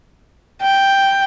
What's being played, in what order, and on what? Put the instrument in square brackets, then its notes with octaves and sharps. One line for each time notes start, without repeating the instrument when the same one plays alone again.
[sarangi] G5